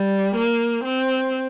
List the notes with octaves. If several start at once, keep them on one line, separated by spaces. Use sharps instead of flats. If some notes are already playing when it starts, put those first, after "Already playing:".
Already playing: G3
A#3
C4